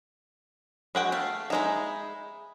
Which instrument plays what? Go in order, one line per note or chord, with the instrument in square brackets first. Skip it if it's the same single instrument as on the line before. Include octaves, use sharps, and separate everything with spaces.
[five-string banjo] G#3 F#4 G5
[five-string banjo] A3 [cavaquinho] F5
[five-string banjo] G#3 D#4 [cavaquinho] E5 G#5 B5